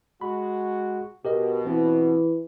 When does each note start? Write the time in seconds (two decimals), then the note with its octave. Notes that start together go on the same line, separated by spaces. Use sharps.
0.21 G#3 F#4 B5
1.25 B2 G4 A#4 D#5
1.67 E3 C4